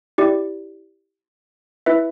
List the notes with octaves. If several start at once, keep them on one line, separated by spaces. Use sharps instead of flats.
E4 G4 D5
E4 B4 E5